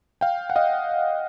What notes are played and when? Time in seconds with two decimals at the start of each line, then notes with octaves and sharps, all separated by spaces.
0.21 F5 G5
0.50 F#5
0.56 D#5 F5